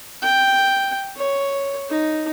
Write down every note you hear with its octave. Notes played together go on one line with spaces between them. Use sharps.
G5
C#5
D#4